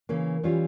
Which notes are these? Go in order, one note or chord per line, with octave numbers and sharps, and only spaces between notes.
C#3 E3 A#3
E3 G3 C#4 F4